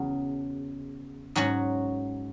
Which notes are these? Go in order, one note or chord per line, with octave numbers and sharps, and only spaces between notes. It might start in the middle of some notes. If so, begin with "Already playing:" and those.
Already playing: E2 C#3 F#3
G#2 F#3 C#4 F#4